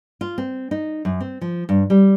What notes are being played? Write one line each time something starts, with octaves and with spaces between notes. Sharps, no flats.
F4
C4
D#4
F#2
C4
F3
G2
G3